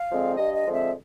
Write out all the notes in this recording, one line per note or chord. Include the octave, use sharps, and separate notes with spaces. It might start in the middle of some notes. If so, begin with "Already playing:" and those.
Already playing: F5
D3 F3 G#3 C4
G2 D#5
D#5
D3 F3 G#3 C4
E5